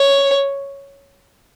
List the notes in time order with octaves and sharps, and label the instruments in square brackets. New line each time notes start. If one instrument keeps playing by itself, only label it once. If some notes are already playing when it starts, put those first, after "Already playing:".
Already playing: [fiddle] C#5